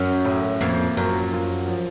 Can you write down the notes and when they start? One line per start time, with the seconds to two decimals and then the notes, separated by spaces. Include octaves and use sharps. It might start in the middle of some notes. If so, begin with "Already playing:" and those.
Already playing: F#2 C#4
0.25 A2
0.61 F2 A#3
0.97 F#2 F3
1.33 F4
1.68 F3